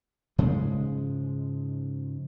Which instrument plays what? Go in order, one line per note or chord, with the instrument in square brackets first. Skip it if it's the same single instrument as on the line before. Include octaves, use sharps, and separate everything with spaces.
[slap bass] G#2 C#3 F3 G#3